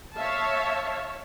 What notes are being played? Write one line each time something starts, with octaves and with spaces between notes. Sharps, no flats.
C#5 E5 F5 A5